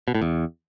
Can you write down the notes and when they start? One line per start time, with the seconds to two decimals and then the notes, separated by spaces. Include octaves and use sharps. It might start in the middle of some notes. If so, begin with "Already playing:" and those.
0.08 B2
0.15 A2
0.21 E2